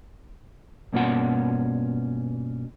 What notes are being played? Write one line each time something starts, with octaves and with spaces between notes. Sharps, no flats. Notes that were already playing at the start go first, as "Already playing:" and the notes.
G2 B2 A#3 C#4 F4 F#5